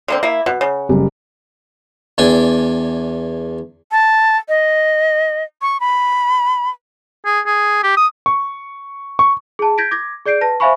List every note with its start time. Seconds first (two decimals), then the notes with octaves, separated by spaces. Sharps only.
0.08 D3 A#3 C4
0.23 A#3 E4
0.46 B2 F#5
0.61 C#3
0.89 F#1 G3
2.18 E2 D4 G5 G#5
3.92 A5
4.49 D#5
5.62 C#6
5.80 B5
7.25 G#4
7.46 G#4
7.83 G4
7.97 D#6
8.26 C#6
9.19 C#6
9.59 G#4 A5
9.78 G6 G#6 A#6 B6 D7
9.91 D6 G#6 A#6
10.26 G#4 D5 G6 C7 D7
10.41 B4 A5 A#6
10.60 C5 E5 F5 G#5 B5 C#6